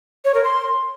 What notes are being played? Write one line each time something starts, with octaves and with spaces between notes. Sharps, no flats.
C#5
A#4
C6